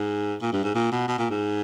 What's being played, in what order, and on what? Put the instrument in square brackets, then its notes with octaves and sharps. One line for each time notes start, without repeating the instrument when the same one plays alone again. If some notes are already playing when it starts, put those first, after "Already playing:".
Already playing: [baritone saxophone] G#2
A#2
G2
G#2
A#2
B2
B2
A#2
G#2